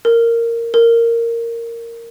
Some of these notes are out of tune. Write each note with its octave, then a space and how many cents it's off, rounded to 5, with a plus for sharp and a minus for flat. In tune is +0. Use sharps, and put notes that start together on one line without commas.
A#4 -10
A#4 -10